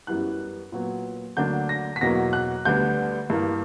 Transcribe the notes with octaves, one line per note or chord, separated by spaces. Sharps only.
F#2 E3 G3 B3 E4 F#6
A#2 F#3 B3
D2 D3 F#3 A#3 D4 G6
A#6
B6
E2 B2 F#3 A#3 A#6
F#6
D2 D3 G3 B3 D4 G6
G2 E3 A#3